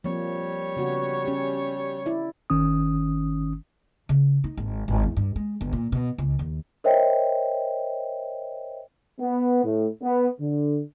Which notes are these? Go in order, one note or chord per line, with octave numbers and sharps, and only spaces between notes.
F3 G3 A#3 C4 C#5
C#3 B3 F#4
C#4 G4
E4 D5
G1 D#3 C#4 D#6
C#3
D#4
G#1
G#1
E2
G2
G#3
G1
A#2
B2
C#2
D#2
A#4 C5 C#5 D#5 E5 G5
B3
A2
B3
D3